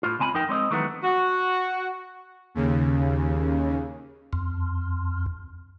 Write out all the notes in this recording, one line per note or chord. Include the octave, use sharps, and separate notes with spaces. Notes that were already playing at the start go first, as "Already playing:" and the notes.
A2 F4
C#2 C4 G#5 A5 B5
F2 D#4 A#4 G5
G#3 C4 D5 D#5
D#3 E3 F#3 G#3 A3 B3
F#4
D#2 C#3
F2